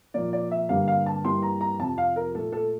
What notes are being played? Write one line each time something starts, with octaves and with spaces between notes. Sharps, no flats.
A#2 F3 A#3 D5
D5
E5
G2 D3 G3 A#3 F5
F5
A5
G2 E3 G3 A#3 C6
A#5
A#5
F2 C3 F3 A5
F5
A#4
A#2 A3 A4
A4